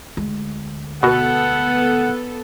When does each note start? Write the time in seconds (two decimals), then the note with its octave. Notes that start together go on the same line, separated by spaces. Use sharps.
0.17 D2 G#3
1.03 B2 B3 F#4 A4 F#5